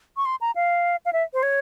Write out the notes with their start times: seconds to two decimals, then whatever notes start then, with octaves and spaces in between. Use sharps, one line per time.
0.17 C#6
0.26 C6
0.41 A#5
0.55 F5
1.05 F5
1.13 E5
1.34 C5
1.43 C#5